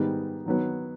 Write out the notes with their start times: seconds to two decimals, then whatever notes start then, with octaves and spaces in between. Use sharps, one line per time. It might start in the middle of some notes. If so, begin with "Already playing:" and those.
Already playing: G#2 D#3 G3 B3 D#4
0.46 D#3 F#3 B3